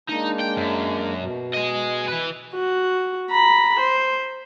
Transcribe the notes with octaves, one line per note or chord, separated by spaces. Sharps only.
G#3 A#3 D4 D#4
G5
F#2
B2
G#4 D#5
E3 B4
F#4
A#5 B5
C5